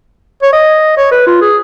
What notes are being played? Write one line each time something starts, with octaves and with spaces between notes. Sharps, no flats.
C#5
D#5
C#5
B4
F4
G#4